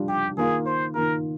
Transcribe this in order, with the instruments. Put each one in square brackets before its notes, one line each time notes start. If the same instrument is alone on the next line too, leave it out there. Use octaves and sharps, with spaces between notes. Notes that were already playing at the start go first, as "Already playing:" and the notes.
Already playing: [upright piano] G3 D4 F4
[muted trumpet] G4
[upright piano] D#3 A#3 F4 [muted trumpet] G#4
[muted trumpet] C5
[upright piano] D#3 A#3 F4 [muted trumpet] A#4